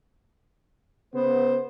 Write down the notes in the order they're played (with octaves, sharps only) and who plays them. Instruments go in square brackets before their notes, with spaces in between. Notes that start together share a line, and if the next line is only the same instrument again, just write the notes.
[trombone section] C#3 B3 [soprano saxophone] C5